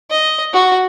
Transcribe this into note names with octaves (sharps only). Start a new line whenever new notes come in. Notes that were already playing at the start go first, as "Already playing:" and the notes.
D#5
F#4